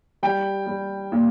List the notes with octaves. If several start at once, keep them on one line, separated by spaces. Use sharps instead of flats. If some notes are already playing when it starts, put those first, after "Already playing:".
G3 G5
G3
A#2